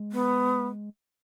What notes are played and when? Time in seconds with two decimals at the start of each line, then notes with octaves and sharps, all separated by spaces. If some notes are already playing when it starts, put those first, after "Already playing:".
Already playing: G#3
0.12 B3